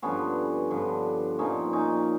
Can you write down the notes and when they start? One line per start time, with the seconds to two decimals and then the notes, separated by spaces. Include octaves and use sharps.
0.02 G2 D3 F3 B3 C#4
0.71 G2 D3 F3
1.39 A#2 F3 C#4 D#4
1.73 C#4 D#4